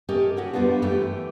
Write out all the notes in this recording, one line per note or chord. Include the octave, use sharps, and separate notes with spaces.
A3 C#4 G4 A#4 D#5
C#4 F#4 G4
F#2 G3 B3 D4 F4
F#2 E3 A3 G4